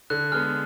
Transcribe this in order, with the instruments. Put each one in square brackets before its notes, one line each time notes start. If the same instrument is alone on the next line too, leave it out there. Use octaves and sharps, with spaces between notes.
[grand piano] D3 [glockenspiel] F#6
[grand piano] G#3 B3 [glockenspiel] F6